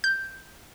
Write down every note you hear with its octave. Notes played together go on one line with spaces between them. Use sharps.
G6